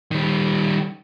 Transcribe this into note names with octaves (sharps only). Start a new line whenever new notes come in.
D#3 G3